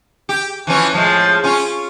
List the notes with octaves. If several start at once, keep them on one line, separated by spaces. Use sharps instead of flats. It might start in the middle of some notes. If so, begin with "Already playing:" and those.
G4
E3 F3 C#4
A2 F3 G#3
C#4 F4